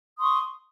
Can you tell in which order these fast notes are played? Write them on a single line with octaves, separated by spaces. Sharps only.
D#6 C6 C#6